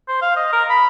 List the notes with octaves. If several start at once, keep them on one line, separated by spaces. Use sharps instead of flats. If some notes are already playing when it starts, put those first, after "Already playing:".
C5
F5
D#5
A#4
B5